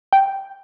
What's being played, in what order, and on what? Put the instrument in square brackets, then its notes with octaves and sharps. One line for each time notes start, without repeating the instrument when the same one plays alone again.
[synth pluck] G5